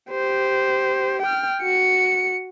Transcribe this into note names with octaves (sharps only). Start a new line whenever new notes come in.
G4 C5
G5 F6
F#4 C#7